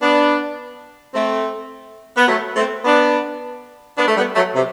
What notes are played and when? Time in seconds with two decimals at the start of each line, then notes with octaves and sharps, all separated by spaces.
0.02 B3 D4
1.15 A3 C4
2.17 B3
2.28 F#3 A3
2.56 A3 C4
2.85 B3 D4
3.98 B3 D4
4.08 A3
4.17 G3 B3
4.36 F#3 A3
4.55 C3